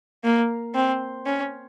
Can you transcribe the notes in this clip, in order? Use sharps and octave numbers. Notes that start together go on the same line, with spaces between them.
A#3
C4
C#4